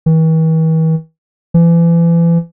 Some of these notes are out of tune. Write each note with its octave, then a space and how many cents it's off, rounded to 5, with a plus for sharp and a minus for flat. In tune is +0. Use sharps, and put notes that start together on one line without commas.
E3 -45
E3 +35